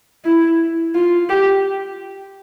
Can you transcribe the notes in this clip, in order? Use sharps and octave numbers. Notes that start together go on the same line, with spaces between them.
E4
F4
G4